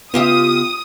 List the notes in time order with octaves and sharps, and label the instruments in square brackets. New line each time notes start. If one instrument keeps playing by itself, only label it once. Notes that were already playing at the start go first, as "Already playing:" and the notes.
[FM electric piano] C#3 B3 [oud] F4 G4 E5 [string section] D#6